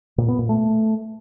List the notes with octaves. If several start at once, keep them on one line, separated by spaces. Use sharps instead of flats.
A#2
B3
A#2
A3